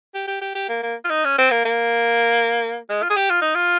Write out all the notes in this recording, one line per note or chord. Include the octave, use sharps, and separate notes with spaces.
G4
G4
G4
G4
A#3
A#3
F4
D#4
C#4
C4
A#3
A#3
G#3
F4
G#4
G4
F4
D#4
F4